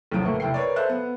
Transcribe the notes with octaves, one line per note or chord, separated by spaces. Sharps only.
B1 E2 C#3 F3 F4 D7
A2 E3 A3 A#3
F1 E4 G5 C7
A#4 B4 C#5 D5
A4 C5 E5 F5 F#6
B3